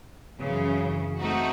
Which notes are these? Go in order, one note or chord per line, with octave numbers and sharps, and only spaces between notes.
F#2 C#3 E3
A3 C4 D#4 F#4